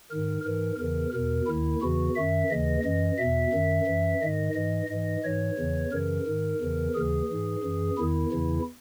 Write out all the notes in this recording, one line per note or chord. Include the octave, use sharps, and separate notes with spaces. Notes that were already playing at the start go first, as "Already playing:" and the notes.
G#2 D#3 A#4
G#2 E3 A#4
E2 C#3 E3 A#4
E2 B2 A#4
D#2 D#3 E4
E2 C#3 E3 F#4
F#2 D#3 E5
D#2 C#3 E3 D#5
F#2 E3 D#5
E2 B2 E5
F#2 D#3
F#2 E3
G#2 D#3 D#5
G#2 E3 D#5
G#2 E3 D#5
G#2 E3 C#5
E2 C#3 E3
F#2 C#3 E3 A#4
G#2 D#3
E2 C#3 E3
D#2 C#3 E3 G#4
G#2 E3
F#2 E3
E2 D#3 E4
E2 C#3 E3